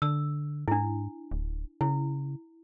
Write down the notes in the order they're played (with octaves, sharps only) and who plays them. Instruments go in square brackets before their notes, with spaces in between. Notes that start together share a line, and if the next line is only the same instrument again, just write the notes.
[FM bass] D3 [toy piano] E6
[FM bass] G#2 [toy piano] D4 E4
[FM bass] D1
[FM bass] C#3 [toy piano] E4